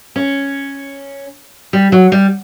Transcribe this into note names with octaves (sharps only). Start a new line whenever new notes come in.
C#4
G3
F#3
G3